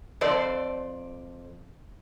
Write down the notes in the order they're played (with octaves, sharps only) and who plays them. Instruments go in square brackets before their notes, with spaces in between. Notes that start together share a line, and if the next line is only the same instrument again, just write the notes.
[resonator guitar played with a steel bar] F2 C5 D5